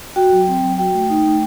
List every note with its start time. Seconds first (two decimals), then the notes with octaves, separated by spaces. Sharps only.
0.16 F#4 G5
0.32 F#3
0.48 C4
0.62 F#3
0.78 F#4 G5
0.94 A3
1.10 D#4
1.26 A3